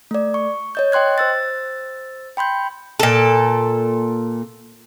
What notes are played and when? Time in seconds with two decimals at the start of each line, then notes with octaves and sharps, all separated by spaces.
0.11 A3 D5
0.34 C#6
0.75 C#5 D#5 G6
0.92 D#5 G5 C6 F#6 G#6
1.18 C5 E6 A6
2.37 G5 B5 C6 G6
3.00 A#2 A4